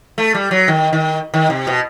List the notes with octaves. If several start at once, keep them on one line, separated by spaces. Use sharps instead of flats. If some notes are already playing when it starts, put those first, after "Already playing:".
A3
G3
F#3
D#3
D#3
D#3
C3
B2